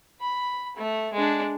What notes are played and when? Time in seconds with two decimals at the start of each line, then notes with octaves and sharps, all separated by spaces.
0.21 B5
0.77 A3
1.13 G#3 D4